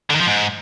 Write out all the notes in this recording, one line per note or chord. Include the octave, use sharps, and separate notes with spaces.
D3
D#3
F3
G#2